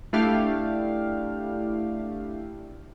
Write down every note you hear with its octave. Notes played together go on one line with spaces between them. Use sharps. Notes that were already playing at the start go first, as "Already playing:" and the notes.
A3 D4 E4 G4 F5